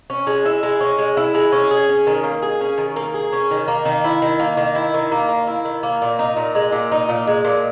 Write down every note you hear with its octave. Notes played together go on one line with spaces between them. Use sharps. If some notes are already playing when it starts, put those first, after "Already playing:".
C#4
G#3
E4
G#3
C#4
G#3
E4
G#3
C#4
G#4
C#4
D#3
A#3
G#4
C#4
D#3
A#3
G#4
C#4
D#3
A#3
D#3
E4
D#3
A#3
D#3
E4
D#3
A#3
D#3
E4
D#3
A#3
A#2
D#4
A#2
G#3
A#2
D#4
A#2
G#3
A#2